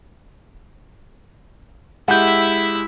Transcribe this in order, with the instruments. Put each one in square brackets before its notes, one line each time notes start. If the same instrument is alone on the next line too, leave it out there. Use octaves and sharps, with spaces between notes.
[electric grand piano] G#3 G4 G6 [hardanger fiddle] E4 E5 [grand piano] F#5